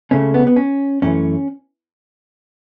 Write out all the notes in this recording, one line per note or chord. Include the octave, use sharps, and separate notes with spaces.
C#2 C#3 A3 C#4
B3
B3
C#4
F#2 E3 A3 C#4